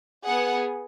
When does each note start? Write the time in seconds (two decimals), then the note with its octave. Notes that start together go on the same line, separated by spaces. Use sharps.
0.25 B3 G#4 F#5